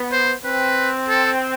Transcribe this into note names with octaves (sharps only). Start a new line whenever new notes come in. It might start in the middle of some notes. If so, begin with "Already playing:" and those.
Already playing: B3
C5
C4 B4
A4